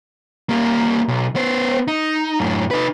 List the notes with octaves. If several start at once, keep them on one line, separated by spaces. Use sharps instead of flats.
G3 A#3
B1
B3 C5
D#4
F#2 A2
D#4 B4